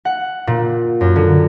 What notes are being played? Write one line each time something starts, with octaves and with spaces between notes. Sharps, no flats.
F#5
A#2
F#2
D3